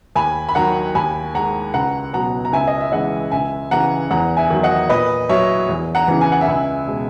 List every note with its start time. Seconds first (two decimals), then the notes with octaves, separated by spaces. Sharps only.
0.16 D#2 G#5 B5
0.49 B5
0.55 D#3 F#3 F#5 A#5
0.95 D#2 G#5 B5
1.35 D#3 G#3 F#5 A#5
1.74 C#2 F#5 A#5
2.13 B2 F#3 F#5 A#5
2.45 A#5
2.52 C#2 E5 G#5
2.68 D#5
2.81 E5
2.92 C#3 E3 G#3 D#5 F#5
3.32 C#2 E5 G#5
3.71 C#3 E3 F#5 A#5
4.11 E2 F#5 A#5
4.37 E5 G#5
4.50 D#3 F#3
4.63 D#5 F#5
4.90 A#2 B4 D#5
5.29 F#3 C#5 E5
5.69 E2
5.95 F#5 A#5
6.08 C#3 E3
6.21 G#5
6.32 F#5
6.41 E5 G#5
6.48 C#2
6.87 B2 G#3